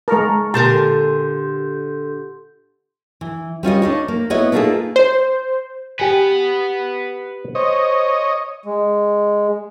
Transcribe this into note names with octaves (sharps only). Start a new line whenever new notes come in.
G#3 A#4 A5 A#5 C#6
A#2 D3 G4 A#4 A5 C6 G6
E3
G3 C#4 F4 D#5
D4 D#4 C#5
A#3
B3 E4 C#5 D#5
A3 A#3 D#4 F4 G#4 A4
C5
G4 B4 F#5 G#5
C5 C#5 D#5
G#3